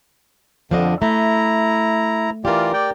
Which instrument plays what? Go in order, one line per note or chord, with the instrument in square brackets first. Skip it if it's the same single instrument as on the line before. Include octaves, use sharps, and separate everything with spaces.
[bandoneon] F2 D3 [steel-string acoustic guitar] F3 D4 D#5
[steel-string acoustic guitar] A3 [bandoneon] E4 A#5
[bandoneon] E3 F4 D5 [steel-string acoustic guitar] G4 A#4
[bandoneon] D5 G5